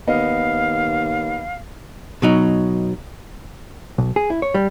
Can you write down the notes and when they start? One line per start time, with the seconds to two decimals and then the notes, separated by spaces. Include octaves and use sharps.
0.08 D#2 B3 D#5 F5
2.22 B2 F#3 D#4
3.98 B1
4.16 G#4
4.30 E4
4.42 C#5
4.54 G3